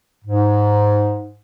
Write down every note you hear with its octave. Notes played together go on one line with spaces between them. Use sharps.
G#2